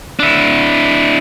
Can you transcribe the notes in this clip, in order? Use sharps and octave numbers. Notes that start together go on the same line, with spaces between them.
D4 E4